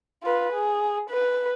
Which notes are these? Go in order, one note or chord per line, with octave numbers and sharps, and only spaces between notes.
F4 B4
G#4
B4